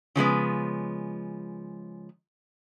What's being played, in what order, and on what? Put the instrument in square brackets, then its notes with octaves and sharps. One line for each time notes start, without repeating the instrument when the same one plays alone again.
[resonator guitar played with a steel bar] C#3 F3 G#3 B3